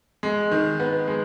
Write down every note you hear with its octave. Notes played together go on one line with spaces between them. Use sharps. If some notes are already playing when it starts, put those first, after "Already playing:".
G#3
D#3
B3
G#3